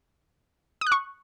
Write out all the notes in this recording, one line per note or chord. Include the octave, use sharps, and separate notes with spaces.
D#6
F#6
C#6